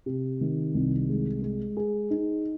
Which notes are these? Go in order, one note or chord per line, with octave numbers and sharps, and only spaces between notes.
C3
D#3
C2
G#3
G#3
G#4
D#4